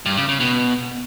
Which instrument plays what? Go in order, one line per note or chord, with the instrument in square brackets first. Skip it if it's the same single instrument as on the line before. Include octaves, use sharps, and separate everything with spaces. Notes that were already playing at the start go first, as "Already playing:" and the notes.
[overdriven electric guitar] G2
C#3
C#3
B2